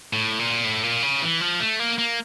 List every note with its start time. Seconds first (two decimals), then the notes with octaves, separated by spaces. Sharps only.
0.13 A2
0.39 A#2
0.65 A2
0.83 A#2
1.03 C#3
1.22 E3
1.41 F3
1.60 A3
1.79 A#3
1.98 A#3